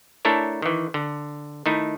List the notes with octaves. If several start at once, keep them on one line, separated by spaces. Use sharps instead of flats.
A3 D4 E4 A4 A#4 C#5
D#3 E3
D3
D#3 A3 D#4 E4